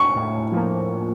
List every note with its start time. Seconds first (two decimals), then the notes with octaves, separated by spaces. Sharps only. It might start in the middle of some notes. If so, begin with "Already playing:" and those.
Already playing: C#6
0.16 A2
0.52 F3 A#3